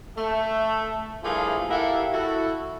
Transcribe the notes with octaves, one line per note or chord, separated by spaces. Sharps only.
A3
G2 F3 A3 A#3 E4 G#4
E4 G4 A4 A#4 F5 F#5
E4 F#4 A4